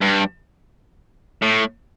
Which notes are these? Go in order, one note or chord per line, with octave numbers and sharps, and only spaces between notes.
G2
A2